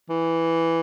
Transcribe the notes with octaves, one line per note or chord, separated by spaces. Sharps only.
E3